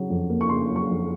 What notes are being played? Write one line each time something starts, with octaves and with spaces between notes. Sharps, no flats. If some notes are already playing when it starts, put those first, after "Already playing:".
Already playing: C#3 F#3
F2
A#3
C#6
C#3 C6
F#3
C#6
F2